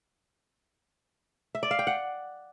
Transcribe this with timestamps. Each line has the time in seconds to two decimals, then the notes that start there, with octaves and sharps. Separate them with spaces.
1.55 E5
1.63 D5
1.71 F5
1.79 G5
1.87 F#5